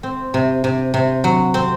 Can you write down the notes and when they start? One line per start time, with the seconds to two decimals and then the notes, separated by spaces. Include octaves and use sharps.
0.03 C4
0.34 C3
0.64 C3
0.94 C3
1.24 F#3
1.54 C4